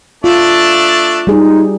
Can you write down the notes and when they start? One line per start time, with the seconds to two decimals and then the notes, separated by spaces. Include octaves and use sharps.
0.24 A3 D4 F4 A5
1.27 G3 D#4 G#4